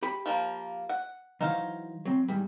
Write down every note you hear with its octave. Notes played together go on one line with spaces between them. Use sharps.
G4 B5
F3 A3 A#3
F#5
E3 F#3 D#4 C5 F5
F#3 C4
E2 G#2 G3